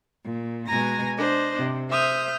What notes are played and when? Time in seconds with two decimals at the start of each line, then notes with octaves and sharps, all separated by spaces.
0.24 A#2
0.67 B2 G#3 G#5 A#5 A#6
1.17 D4 C5 D#5
1.58 C3
1.89 C5 E5 D#6 F6 G6